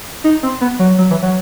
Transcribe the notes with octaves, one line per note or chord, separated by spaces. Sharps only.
D#4
C4
B3
F#3
F#3
E3
F#3